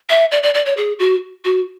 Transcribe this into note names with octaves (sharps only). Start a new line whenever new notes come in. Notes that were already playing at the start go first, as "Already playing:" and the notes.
E5
D5
D5
D5
C#5
G#4
F#4
F#4